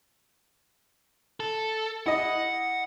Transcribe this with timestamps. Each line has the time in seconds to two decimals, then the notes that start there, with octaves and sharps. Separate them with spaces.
1.40 A4
2.06 E4 D#5 F#5